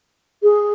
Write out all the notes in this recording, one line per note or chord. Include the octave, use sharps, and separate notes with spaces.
G#4